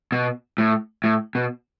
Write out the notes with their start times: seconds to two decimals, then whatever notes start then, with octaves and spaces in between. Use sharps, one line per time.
0.12 B2
0.58 A2
1.04 A2
1.35 B2